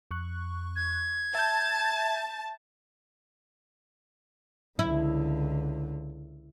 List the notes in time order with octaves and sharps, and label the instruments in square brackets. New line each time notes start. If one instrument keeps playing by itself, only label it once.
[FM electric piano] F2 C#6 F#6
[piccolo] G#6
[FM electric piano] E5 G6 [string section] A5
[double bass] C#2 D3 [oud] E4